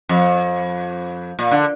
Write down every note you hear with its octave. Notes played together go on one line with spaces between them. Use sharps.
F2
A#2
D3